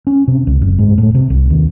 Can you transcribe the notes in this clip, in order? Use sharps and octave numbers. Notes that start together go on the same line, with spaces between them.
C#4
C3
C#2
F#1
G#2
A2
C3
C2
D#2